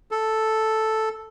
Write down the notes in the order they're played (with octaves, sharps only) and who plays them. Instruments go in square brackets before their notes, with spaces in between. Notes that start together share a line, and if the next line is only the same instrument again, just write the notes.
[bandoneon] A4